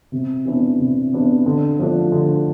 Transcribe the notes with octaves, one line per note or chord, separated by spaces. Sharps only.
C3
E3 B3 D4
C3
E3 B3 D4
D3
F3 A3 D4
D3